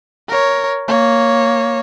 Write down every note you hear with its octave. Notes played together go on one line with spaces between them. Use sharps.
A#4 C#5
A#3 C#5